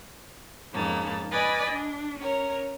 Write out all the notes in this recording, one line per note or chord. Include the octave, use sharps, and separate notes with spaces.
F2 G#2 C#3 A#3 A5
B4 D5 D#5 G#5 B5 A6
D4
C#4 A#4 C#5